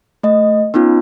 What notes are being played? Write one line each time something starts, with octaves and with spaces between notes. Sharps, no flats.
A3 D#5
B3 C#4 D#4 F4